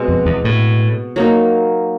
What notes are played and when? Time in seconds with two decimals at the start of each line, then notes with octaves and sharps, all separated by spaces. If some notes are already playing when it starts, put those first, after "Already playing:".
Already playing: B2 G#3 C4
0.08 F2
0.26 E2
0.45 A2
1.16 F#3 A#3 D#4